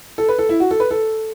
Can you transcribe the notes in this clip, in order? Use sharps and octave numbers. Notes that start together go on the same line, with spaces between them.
A4
B4
A4
E4
F#4
A4
B4
A4